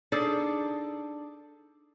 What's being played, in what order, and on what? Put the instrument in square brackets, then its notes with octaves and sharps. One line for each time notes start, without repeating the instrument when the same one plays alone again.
[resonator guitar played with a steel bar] D4 D#4 G#4 A4 D5